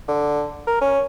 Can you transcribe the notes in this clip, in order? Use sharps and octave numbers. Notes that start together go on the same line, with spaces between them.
D3
A#4
C#4